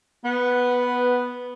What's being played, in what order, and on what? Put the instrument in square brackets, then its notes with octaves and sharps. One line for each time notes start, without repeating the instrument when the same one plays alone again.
[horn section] B3